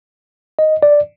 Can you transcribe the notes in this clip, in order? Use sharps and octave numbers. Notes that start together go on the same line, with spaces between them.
D#5
D5